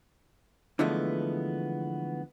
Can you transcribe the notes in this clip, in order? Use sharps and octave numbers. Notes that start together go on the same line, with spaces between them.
D3 E3 F3 G#3 A3 B3